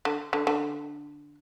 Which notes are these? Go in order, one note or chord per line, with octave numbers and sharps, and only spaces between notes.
D3
D3
D3